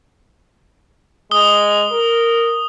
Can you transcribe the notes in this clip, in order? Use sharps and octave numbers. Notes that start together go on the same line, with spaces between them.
G#3 D#6 G7
A#4